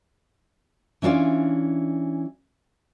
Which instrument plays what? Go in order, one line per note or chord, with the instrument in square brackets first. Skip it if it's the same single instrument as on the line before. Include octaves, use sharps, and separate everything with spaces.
[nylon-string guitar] E3 C#4 D4 F4 D5